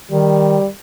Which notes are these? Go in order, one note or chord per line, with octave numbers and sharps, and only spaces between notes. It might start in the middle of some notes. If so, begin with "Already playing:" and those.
D#3 G3